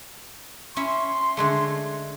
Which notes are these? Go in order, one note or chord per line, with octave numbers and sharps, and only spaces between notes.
C#4 E4 E5 C6
D3 G#3 A3